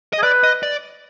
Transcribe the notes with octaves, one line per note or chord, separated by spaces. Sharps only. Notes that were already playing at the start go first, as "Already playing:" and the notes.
D#5
G#4
B4 D5
D#5
D5